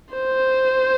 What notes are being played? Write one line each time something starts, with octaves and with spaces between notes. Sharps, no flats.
C5